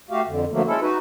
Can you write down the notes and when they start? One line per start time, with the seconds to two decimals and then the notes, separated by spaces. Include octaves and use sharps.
0.10 A3 F#4 G4 F5
0.27 F2 D3
0.52 D3 F3 F#3 A3 A#3
0.67 G#3 C#4 E4 A4
0.81 D#4 F#4 B4